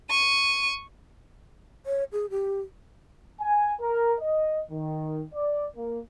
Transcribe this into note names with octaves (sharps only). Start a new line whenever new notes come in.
C#6 D#7
C#5
G#4
G4
G#5
A#4
D#5
D#3
D5
A#3